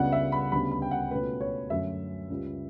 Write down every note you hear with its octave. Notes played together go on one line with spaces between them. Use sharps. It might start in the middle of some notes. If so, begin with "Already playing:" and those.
Already playing: C#2 C#3 G3 B3 D4 F#5
E5
B5
D2 C#3 G3 B3 B5
B5
G5
F#5
C#2 B2 A3 C#4 B4
C#5
F#2 D3 F#3 A3 C#4 E5
C#2 C#3 G3